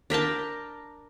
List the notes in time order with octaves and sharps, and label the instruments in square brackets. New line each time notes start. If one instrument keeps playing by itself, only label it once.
[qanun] D4 A#4 G5 A5